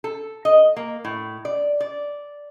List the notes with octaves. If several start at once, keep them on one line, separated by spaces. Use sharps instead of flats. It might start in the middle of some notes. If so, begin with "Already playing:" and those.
A4
D#5
A#3
A2
D5
D5